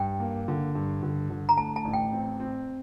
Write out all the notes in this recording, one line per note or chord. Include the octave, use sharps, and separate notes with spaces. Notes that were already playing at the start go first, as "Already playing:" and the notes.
Already playing: G2 G5
A#3
D3
G2
D3
D3
A#5
A2 A5
A5
A1
G5
C4
C4